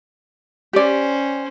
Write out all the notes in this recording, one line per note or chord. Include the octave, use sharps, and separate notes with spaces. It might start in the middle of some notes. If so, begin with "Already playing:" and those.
C#4 G4 C5 D5